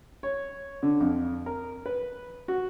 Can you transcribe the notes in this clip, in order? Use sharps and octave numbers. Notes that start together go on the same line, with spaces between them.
C#5
D3
F2
A#4
B4
F#4